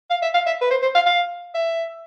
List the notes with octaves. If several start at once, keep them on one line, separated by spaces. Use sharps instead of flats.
F5
E5
F5
E5
B4
C5
C5
F5
F5
E5